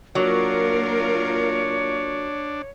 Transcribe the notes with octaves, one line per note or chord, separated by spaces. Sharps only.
F#3 A#3 D4 F4 A#4 C#5